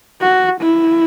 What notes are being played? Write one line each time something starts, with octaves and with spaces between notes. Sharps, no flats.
F#4
E4